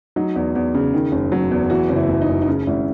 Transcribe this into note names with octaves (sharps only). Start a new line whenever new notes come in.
F#3 D#4
E2
E2
C#3
D#3
F#1
F#3
E2
E3 F#4
F#1
E4
F#1 E4
D#4
F#2
D#4
C#3 C#4
G#1 E4